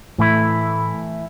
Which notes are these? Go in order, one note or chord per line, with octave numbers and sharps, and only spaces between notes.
A2 E3 A3 E4